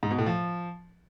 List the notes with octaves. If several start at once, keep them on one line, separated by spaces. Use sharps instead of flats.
G#2
B2
A2
F3